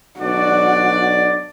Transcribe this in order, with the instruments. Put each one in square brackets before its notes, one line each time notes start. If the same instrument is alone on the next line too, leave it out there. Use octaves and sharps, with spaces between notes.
[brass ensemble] B1 D4 D5 [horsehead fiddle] F#4